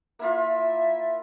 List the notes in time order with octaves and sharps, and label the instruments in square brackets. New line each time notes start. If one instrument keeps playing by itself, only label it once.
[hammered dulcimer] A#3 E4 F4 [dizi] E5